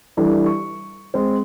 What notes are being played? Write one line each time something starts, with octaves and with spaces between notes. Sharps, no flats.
E3 G3 D4 A4
C#6
G#3 C4